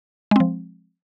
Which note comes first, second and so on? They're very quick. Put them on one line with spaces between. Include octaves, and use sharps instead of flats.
G#3 C4 F3